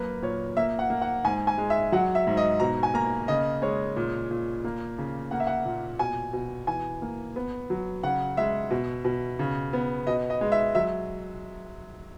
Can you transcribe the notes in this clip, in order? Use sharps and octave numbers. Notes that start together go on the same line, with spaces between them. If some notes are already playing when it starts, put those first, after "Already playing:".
Already playing: F#2 A#3 B4
A#2 C#5
A#3 E5
F#5
A#3
F#5
G#2 G#5
G#5
G#3
E5
F#3 F#5
E5
G#2
D#5
B2 A#5
G#5
A#3 A#5
C#3 D#5
G#3 C#5
A#2
A#2
A#3
C#3
A#3 F#5
E5
F#5
A#2
B2 G#5
B2
E3 G#5
A#3
B3
F#3
C#3 F#5
G#3 E5
B2
B2
C#3
B3
B2 D#5
D#5
G#3
E5
F#3 E5